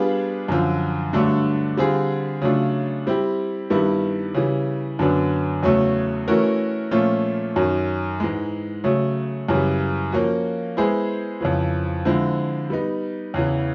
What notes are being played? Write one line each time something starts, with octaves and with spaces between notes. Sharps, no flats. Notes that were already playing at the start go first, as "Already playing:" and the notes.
Already playing: G3 B3 D4 F4 G#4
F#2 D3 F3
G2 D3 F#3 A3 D4
D3 G3 C4 F4 G#4
C#3 F#3 A3 D4 F4
G3 C4 E4 G4
G2 D#3 G3 B3 E4
C#3 E3 G3
F#2 D3 F#3 B3 D4
E2 C#3 F#3 A3 C#4
E3 A3 C#4 F#4 A#4
A#2 F3 A3 C#4 F4
F#2 D#3 F#3
G#2 E3 G#3
C#3 F#3 A3
F#2 C#3 E3 G3
F3 A#3 C#4 F#4
G#3 B3 E4 G#4 C5
F2 C#3 E3
D3 F3 G#3 C4 E4
G3 B3 D#4
E2 C#3 E3